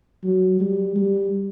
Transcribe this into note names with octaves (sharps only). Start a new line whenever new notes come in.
F#3
G3
G3